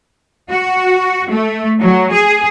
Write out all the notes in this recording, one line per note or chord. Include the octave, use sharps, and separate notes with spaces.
F#4
A3
F#3
G#4